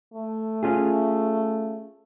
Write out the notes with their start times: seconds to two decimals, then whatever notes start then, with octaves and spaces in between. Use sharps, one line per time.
0.14 A3
0.63 C#4 F4 G#4